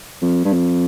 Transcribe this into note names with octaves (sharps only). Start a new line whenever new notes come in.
F2
G2
F2